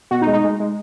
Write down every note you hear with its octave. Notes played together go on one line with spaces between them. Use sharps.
B2 F#4
D#4
G#3
D#4
G#3
G#3